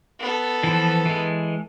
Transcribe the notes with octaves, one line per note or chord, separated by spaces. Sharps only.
B3 A4
E3 F3
E3 G#3